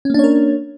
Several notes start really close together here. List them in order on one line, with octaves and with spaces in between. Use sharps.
C#4 A#3 D4 C#5 A#4